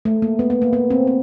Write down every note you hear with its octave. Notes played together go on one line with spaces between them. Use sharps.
A3
A#3
B3
B3
A#3
B3
C4
C4